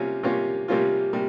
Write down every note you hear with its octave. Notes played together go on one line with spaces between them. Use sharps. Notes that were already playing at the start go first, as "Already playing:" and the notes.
Already playing: C3 G3 A#3 C#4 F4
C3 G3 A#3 C#4 F4
C3 G3 A#3 C#4 F4
C3 G3 A#3